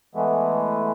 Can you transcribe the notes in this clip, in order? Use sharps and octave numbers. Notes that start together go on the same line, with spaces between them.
E3 G#3 A3 B3